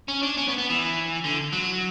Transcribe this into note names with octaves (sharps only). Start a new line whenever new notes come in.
C#4
D4
C#4
B3
B3
E3
D3
F#3